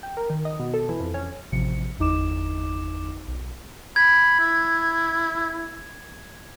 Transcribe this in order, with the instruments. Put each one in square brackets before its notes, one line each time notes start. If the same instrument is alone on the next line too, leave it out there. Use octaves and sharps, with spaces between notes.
[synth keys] G5
A#4
D#3
D#5
B2
A4
E3
F2
C#4
A1 C3 F3 C#7
G1 E2 D#4 D6 E7
B1
[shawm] B5 [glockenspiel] G#6
[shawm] E4